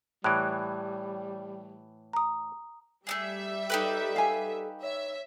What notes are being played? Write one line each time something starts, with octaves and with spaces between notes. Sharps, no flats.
A2 E3 G3 F#6 D7
A#5 D#6
G3 A3 B3 G#4 E5
D#4 G4 A4 B4
F5 G#5
C#5 E5